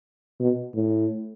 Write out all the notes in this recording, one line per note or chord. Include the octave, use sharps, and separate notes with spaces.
B2
A2